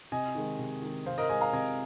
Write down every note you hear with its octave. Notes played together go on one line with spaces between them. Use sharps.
C3 D#5 G#5
D#3 G#3
C3
D#3 G#3
C3 C5 F5
A#4 D#5
G#3 D#5 G#5
F5 A#5
C3 D#5 G#5